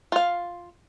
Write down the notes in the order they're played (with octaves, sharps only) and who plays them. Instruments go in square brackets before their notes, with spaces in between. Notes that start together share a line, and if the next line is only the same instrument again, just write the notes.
[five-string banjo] F4 F5